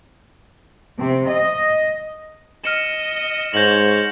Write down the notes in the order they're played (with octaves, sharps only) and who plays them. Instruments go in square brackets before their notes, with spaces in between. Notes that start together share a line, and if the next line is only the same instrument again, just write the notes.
[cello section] C3
D#5
[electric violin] D#5 [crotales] F6 C#7 E7
[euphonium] G#2 [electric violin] C5 C#5 [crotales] G6 A#6 F#7